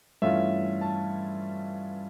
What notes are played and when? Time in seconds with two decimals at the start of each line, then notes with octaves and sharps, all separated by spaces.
0.22 G2 E3 A3 C#4 F4 E5
0.81 A5